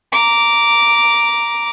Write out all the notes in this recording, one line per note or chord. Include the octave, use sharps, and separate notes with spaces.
A#5 D6